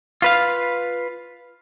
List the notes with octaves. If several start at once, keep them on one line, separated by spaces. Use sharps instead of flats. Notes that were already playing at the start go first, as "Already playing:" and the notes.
F4 B4 F5